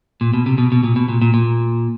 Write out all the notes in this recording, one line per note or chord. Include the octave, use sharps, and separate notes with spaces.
A#2
B2
C3
B2
B2
A#2
B2
A#2
A#2
A#2